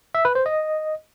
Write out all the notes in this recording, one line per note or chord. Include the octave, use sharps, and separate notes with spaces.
E5
B4
C5
D#5